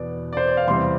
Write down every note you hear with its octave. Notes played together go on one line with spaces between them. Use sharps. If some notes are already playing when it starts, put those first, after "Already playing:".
Already playing: E2 B2 B3 D5
D5
C5
D5
F5
E2 C3 G3 C4 C6